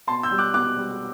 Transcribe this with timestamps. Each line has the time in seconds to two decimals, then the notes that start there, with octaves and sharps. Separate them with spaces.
0.07 B2 A5 C6
0.23 E6 G6
0.31 G3
0.38 D6 F#6
0.54 B2 D6 F#6
0.77 G3